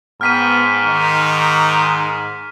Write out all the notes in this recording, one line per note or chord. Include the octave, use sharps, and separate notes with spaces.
G#2 B3 G5 F6 B6 D#7
D#3